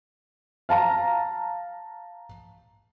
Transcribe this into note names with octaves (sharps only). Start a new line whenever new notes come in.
F5 A5 A#5